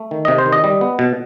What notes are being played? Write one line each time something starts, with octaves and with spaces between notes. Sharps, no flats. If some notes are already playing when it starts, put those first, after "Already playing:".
Already playing: A3
D#3
C3 D#5
C5
D#3
D#5
G3
B3
B2